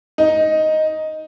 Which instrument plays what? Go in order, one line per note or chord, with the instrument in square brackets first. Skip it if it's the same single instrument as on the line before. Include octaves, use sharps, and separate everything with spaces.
[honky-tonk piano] D#4